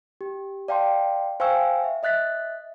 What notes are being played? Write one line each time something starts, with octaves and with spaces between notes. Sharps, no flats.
G4
D5 F5 G5 A5 C6
C5 F5 G5 G#5 C#6 E6
E5
D#5 E5 F#6 A6 B6